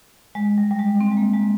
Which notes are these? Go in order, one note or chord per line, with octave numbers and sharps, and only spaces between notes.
G#3
G3
G3
G#3
C4
G#3
A#3
G#3